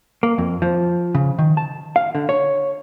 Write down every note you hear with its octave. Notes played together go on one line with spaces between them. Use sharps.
A#3
F2
F3
C#3
D#3
A5
F5
D3
C#5